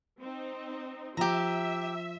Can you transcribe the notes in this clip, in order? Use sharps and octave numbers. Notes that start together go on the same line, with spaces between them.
C4 D#4
F3 G4 E5 A#5